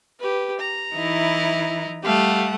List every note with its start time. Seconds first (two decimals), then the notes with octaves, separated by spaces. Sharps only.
0.19 G4 B4
0.60 A#5
0.94 E3 D#4 E4
2.03 G3 A3 G4 F5 F#5